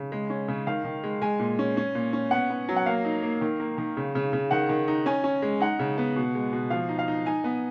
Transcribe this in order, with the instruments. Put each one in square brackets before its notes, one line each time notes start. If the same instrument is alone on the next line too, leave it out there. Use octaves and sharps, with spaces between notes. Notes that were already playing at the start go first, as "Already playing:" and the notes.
Already playing: [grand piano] C#3
G#3
C#4
C#3
D#3 F5
D#3
G#3
G#3 G#5
A#2
C#4
C#4
A#2
C#4
B3 F#5
B3
F#3
F#5
A#3 F5
D#4
A#3
D#3
A#3
D#3
C#3
C#3
C#3
D#3 F#5
D#3
D#4
C#4 G#5
C#4
G#3
D#4 F#5
C#3
B3
B2
G#3
B2
F3 F5
D#4
F5
D#4
D#4 G#5
B3